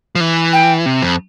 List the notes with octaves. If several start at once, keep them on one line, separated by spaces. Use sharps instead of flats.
F3
E3
G5
C3
F2